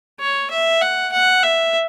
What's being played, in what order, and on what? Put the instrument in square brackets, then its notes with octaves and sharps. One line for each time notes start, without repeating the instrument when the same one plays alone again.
[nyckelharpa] C#5
E5
F#5
F#5
E5